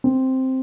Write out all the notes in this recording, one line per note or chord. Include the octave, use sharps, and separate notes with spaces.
C4